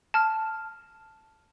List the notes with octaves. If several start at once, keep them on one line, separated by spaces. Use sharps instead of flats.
A5 F6